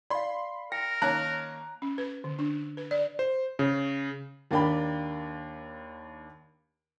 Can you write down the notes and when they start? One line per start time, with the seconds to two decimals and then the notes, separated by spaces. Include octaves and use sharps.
0.10 D5 F5 B5 C6
0.72 A#4 G5 A#6
1.02 D#3 A#3 C#4 A5 A#5 F#6
1.82 C#4
1.98 B4
2.24 D3
2.39 D4
2.77 B4
2.91 D5
3.19 C5
3.59 C#3
4.51 D#2 A#3 D4 G5 B5